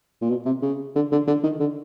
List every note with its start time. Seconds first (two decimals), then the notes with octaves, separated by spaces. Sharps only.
0.22 A#2
0.30 B2
0.46 C3
0.62 C#3
0.95 D3
1.12 D3
1.27 D3
1.43 D#3
1.60 D3